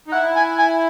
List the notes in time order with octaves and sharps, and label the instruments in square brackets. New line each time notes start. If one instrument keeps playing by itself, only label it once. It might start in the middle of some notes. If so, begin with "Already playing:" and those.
[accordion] D#4
[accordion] E4 [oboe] F#5
[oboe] G#5
G#5